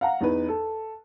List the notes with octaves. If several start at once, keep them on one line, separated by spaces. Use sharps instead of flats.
F5 F#5 A#5
E2 D#4 B4
A4